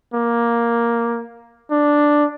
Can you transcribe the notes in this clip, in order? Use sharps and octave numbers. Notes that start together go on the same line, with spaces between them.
A#3
D4